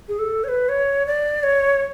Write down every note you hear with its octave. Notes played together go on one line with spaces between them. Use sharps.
G#4
A4
C#5
B4
C#5
D5
C#5